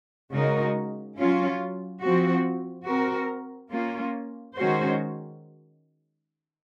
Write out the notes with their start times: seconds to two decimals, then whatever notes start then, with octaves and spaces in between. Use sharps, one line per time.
0.32 C#3 G#3 D#4 F#4 A#4
1.17 F#3 C#4 F4
2.02 F3 C4 F#4
2.86 C4 F#4 A#4
3.71 A#3 C#4 F4
4.56 D#3 G#3 C#4 F#4 C5